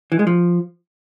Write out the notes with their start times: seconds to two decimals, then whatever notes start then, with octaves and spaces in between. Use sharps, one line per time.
0.12 E3
0.19 G#3
0.27 F3